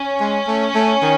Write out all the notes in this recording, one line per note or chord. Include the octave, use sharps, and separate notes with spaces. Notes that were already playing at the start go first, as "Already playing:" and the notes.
Already playing: C#4
G#3
A3
A3
D#3